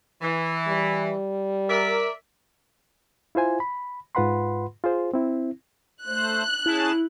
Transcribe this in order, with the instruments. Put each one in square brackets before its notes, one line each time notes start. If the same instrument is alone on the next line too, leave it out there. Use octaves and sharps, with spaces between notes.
[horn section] E3
[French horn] G3
[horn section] A#4 D5 E5
[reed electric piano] E4 F4 C5 G#5
B5
G#2 F4 B4 F#5 B5 C6
F4 G#4 C5
C4 E4
[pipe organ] A3 C5 [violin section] F#6
[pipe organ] C#4 G#4 A5 [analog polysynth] E4